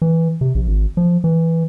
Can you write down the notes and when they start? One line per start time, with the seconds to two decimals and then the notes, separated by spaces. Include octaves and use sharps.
0.02 E3
0.41 C3
0.55 A#1
0.67 G#1
0.97 F3
1.24 E3